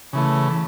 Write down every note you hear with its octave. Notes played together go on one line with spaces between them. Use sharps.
C#3 E3 A3